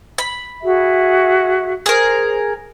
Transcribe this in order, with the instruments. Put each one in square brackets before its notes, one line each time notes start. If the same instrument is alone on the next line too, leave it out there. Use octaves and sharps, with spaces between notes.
[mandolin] B5
[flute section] F#4 G#4 E5
[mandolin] G#4 A#4 [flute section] C5